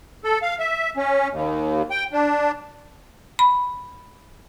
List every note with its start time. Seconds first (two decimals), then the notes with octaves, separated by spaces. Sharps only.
0.24 A4
0.42 F5
0.59 E5
0.97 C#4
1.30 D#2
1.91 G5
2.13 D4
3.39 B5